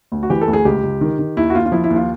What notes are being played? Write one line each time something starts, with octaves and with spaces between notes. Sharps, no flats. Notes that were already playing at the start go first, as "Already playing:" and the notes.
D2
F#4
E3 G4
A4
D2
G#4
C#2 G4
C#2
D#3
D#3
D#2 E4
F#4
D#2 F4
F4
F3 E4
E4
D#2
F4